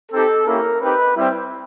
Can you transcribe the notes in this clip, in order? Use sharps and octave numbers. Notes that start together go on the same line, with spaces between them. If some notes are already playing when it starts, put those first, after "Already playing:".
C4 D#4 G4 A4
A#3 C#4 E4 G4 A#4
C4 D#4 G4 B4
G3 C4 E4